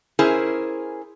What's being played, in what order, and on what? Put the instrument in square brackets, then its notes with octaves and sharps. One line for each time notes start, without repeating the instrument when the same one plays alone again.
[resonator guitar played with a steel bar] C#4 E4 G#4 A#4 C5